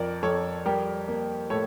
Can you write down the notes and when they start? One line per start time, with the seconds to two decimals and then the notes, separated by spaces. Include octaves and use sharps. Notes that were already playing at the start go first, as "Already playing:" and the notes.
Already playing: F2 F3 A#4 D5
0.23 F2 A4 C#5
0.66 G3 G4 A#4
1.08 A#3
1.50 A2 A4 C#5